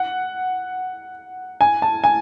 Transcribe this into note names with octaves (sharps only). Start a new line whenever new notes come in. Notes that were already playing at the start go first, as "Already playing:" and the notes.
Already playing: F#5
G#5
A5
G#5